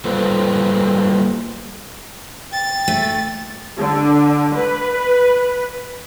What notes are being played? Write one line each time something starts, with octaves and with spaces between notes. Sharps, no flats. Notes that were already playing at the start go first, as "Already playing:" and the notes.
G3 A#3 F4 A4 B4 C5
G5 A6
A3
D3
B4